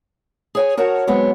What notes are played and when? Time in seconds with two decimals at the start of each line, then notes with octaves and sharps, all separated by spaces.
0.55 G#4 C#5 G#5
0.77 F#4 A#4 C#5 F#5 A5
1.07 F#3 G#3 B3 C4 C#5